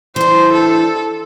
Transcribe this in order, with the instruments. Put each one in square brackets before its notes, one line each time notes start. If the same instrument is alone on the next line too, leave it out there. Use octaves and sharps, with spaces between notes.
[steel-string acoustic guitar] E3 D4 [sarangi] C5
[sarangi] A4